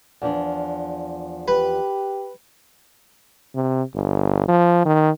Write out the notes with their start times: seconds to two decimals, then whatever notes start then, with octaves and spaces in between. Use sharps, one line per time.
0.22 E2 F3 D4
1.48 G4 B4
3.55 C3
3.95 G1
4.48 F3
4.85 D#3